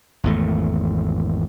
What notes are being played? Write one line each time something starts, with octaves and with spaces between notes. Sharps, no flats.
G#1 E2 A3